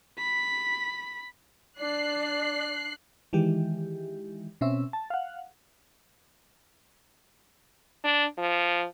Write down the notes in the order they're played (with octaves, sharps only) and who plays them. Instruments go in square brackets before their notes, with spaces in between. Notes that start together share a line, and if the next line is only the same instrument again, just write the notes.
[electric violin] B5 B6
[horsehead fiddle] D4 [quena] D5 [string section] F#6 C7
[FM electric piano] D#3 E3 G#3 G4
B2 C4 C#4 E5
A5
F5 F#5
[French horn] D4
F3